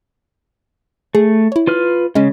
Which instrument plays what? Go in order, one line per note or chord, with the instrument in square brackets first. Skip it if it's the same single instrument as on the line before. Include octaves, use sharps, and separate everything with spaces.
[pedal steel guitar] A3 [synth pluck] G#4
[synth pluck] E4 C#5
[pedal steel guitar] F4 B4 F6
[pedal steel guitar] C#3 [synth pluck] G#3 C#4